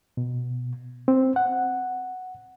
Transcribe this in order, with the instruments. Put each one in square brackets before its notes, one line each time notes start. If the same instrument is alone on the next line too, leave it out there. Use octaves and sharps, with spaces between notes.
[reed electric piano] B2
C4
F#5